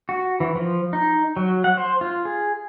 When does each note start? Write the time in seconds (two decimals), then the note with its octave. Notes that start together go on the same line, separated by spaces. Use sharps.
0.09 F#4
0.40 E3
0.56 F3
0.93 D#4
1.37 F#3
1.64 F#5
1.77 C5
2.01 F4
2.25 G#4